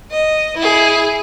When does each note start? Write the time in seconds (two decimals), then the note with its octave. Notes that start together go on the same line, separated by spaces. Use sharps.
0.11 D#5
0.58 E4 G#4